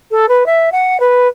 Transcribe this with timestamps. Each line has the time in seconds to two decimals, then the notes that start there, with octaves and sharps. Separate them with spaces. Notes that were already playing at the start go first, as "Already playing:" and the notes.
0.11 A4
0.28 B4
0.46 E5
0.72 F#5
1.00 B4